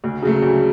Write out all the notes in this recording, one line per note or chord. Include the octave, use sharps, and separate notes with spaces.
D2
C#3 F#3 A3
D2